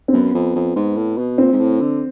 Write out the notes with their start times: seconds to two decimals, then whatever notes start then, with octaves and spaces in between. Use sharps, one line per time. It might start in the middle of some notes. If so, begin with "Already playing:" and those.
0.08 C4
0.13 F#2 B3
0.34 F2
0.55 F2
0.76 G#2
0.97 A2
1.18 B2
1.38 A#2 C4
1.53 G#2
1.60 A2
1.81 D3